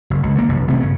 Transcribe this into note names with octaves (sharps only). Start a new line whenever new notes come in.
F#1
C#2
D3 F3 A#3
F1 B1 F#2
G#1 C3 A3 B3
G1 C#3